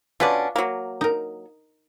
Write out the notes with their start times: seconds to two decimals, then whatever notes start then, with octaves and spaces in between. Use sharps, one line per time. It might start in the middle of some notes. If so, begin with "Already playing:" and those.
0.20 B2 C#4 D4 F4 B4 D5
0.56 F#3 A#3
1.01 D#4 A#4